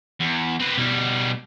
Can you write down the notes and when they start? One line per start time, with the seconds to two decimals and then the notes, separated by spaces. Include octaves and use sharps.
0.20 E2
0.60 C4 B4
0.77 B2 G3